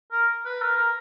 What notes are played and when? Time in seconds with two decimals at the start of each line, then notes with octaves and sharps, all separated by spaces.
0.12 A#4
0.45 B4
0.62 A#4
0.77 A#4